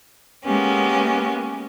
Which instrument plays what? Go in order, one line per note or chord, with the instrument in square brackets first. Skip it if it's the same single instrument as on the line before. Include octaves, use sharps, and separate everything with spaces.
[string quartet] G#3 A#3 B3 C#4 G4